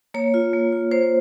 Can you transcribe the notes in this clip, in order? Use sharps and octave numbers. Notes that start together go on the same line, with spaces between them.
A#3 C#5
F4
A#3
F4
A#3 C5